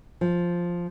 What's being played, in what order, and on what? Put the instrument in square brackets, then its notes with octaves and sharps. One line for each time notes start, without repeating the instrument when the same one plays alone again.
[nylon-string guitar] F3